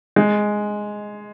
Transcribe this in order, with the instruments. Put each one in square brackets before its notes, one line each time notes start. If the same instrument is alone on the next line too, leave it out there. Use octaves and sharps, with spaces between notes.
[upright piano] G#3